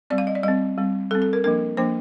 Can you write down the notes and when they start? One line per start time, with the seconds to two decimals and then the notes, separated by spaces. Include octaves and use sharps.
0.10 G3 C4 D5
0.18 F5
0.27 D#5
0.35 D5
0.43 G3 C4 D#5
0.78 G3 C4
1.11 G3 C4 A4
1.22 A4
1.33 A#4
1.44 F3 A#3 D4 A#4
1.77 F3 A#3 D4 C5